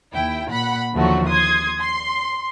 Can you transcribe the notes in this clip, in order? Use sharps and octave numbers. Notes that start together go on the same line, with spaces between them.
D#2 E4 G5
A#2 F#5 B5
D#2 D3 F3 F#3 A3 F#4
C6 D#6 G#6
C6